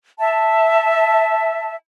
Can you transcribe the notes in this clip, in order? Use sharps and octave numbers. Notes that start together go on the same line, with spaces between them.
E5 A5